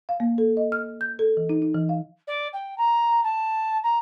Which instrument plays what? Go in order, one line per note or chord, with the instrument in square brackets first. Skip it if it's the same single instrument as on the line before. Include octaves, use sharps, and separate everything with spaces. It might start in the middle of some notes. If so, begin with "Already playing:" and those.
[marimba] F5
A#3
A4
D#5
F6
G6
A4
E3
D#4
D#4
E3
F5
[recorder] D5
G5
A#5
A5
A#5